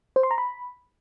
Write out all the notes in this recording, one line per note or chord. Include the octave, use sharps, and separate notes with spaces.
C5
C6
A#5
B5